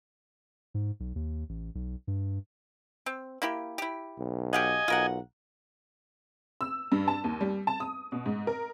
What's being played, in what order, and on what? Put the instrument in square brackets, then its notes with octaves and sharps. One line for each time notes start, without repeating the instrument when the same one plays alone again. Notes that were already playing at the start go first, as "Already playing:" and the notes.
[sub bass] G#2
B1
D#2
A1
B1
G2
[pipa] C4
A#3 E4 G4
E4 G4
[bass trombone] B1
[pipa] G4 F5 F#5 [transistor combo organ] D#5 G#5
[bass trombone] B1 [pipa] F4 A#4 F#5
[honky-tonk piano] E6
G2
A5
D#2
G3
A5
D#6
B2
G#2
A#4